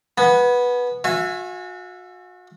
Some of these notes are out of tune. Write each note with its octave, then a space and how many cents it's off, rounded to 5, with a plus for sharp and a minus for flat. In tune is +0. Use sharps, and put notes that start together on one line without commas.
B3 -10 G#5 +35
F#4 -35 E5 +20 G#5 +0